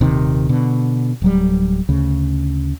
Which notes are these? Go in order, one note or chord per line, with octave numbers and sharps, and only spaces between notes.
D#1 C3 D#3
B2 D3
D1 F#3 G3
D2 C#3